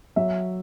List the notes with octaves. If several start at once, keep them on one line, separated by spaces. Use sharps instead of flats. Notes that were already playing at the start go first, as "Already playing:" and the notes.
F#3 E5